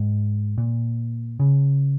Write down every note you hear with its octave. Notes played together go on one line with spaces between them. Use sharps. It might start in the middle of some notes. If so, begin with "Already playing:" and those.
Already playing: G#2
A#2
C#3